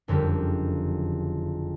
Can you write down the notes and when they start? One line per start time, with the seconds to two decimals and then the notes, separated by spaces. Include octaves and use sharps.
0.08 F#1 F2 D3 G3 G4